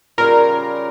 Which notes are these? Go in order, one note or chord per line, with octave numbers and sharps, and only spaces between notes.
C#3 G3 C#4 F4 A#4